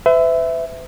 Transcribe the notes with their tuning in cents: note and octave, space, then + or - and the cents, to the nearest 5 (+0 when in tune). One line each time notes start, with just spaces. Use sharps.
B4 +45 E5 +0